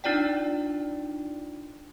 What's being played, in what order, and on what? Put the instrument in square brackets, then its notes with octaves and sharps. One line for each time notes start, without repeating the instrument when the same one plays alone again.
[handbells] D4 D#4 F4 D5 G5